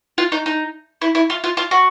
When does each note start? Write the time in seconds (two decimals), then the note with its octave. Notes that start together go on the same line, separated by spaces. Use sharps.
0.18 F4
0.32 D#4
0.46 D#4
1.02 E4
1.15 E4
1.30 F4
1.44 F4
1.57 F4
1.71 F#4